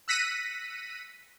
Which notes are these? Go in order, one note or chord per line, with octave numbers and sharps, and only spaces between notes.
E6 F#6 A#6 B6 C#7 D#7